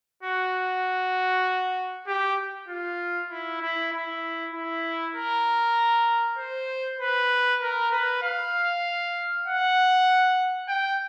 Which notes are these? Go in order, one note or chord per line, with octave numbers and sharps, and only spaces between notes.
F#4
G4
F4
E4
E4
E4
E4
A#4
C5
B4
A#4
B4
F5
F#5
G5